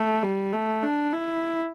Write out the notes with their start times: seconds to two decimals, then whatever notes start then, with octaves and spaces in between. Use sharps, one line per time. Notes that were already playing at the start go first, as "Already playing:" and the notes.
Already playing: A3
0.23 G3
0.53 A3
0.83 D4
1.13 E4